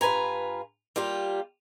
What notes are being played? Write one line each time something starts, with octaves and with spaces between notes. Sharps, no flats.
G2 F4 B4 G#5 A#5
G3 A#3 F4 G4